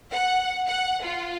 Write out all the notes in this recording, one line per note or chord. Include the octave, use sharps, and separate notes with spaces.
F#5
F#5
F4